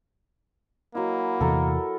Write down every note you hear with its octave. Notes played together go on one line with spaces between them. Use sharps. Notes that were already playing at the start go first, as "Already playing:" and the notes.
F#3 A#3 E4
E2 C3 E3 A4 A#4